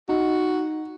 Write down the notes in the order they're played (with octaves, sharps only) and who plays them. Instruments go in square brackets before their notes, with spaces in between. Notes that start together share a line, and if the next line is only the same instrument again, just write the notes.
[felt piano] D#4 [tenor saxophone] F#4